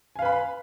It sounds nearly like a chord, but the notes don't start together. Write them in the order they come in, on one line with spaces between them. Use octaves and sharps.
G#5 F5 B4 B5